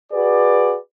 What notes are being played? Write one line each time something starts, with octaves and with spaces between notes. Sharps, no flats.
F#4 G#4 B4 D5